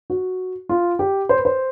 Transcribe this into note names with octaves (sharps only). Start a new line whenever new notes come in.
F#4
F4
G4
C5
B4
C5